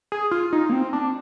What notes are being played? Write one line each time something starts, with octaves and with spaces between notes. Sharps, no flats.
G#4
F4
D#4
A#3
C4
D4